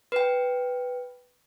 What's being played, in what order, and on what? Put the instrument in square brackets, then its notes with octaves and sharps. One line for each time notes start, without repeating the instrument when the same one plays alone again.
[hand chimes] B4 G5